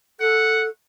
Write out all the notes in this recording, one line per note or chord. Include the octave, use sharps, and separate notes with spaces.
A4 F#5